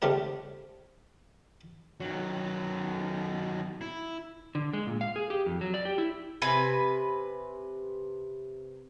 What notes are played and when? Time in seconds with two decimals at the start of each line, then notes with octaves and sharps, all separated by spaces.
0.02 C#3 A3 C4 D4 G4 A#4
2.00 D#3 F#3
3.81 E4
4.55 D3
4.73 G#3
4.87 A#2
5.01 F5
5.16 G#4
5.30 G4
5.46 F2
5.61 F#3
5.74 D5
5.85 G4
5.98 E4
6.42 C3 B4 G#5